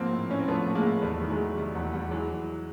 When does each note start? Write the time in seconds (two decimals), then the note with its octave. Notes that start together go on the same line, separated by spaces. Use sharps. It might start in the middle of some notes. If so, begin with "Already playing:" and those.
Already playing: G#2 F3 A#3 C4
0.11 A2
0.29 A2 C#4
0.39 C4
0.48 F3 A3 B3
0.66 A2 A3
0.75 G#3 A#3
0.84 A2
1.02 E2 G3 A3
1.19 D#3 G3
1.30 F#3 G#3
1.38 D#3
1.57 C3 G3
1.75 E2 F#3
1.93 E2 G3
2.11 E3 F#3 G#3
2.29 E3